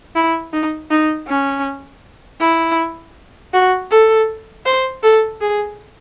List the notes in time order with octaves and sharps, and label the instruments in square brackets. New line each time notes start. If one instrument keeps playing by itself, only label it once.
[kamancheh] E4
D#4
D#4
C#4
E4
F#4
A4
C5
A4
G#4